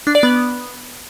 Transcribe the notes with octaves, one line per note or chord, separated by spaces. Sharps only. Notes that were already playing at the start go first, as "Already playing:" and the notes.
D4
D5
B3